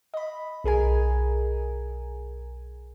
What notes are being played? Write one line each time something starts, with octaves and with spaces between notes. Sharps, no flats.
D#5 B5
B1 G#4 A#4 G#5